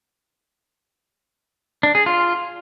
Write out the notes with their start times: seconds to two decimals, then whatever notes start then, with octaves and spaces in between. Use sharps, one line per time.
1.83 D4
1.95 G#4
2.06 F4